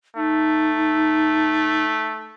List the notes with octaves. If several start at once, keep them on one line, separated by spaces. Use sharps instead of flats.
A3 D#4